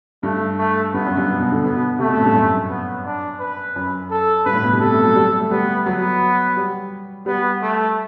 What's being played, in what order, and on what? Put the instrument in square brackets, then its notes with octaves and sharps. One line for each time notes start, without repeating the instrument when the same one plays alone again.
[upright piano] G2 [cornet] A3
[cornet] A3
[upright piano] G2 [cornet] B3
[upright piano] F#2
G2
B2
B2
D3
[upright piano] B2 [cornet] B3
[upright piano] C3 [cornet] A3
[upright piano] B2
A2
G2
F#2
[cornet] B3
D4
B4
[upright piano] F#2
[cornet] A4
[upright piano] G2 [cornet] B4
[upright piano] A2
B2
C3
[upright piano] G3 [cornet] A4
[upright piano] A3
F#3
G3
G3
A3
[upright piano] G3 [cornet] B3
[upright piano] F#3 [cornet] B3
[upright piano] G3
[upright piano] G3 [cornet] B3
[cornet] A3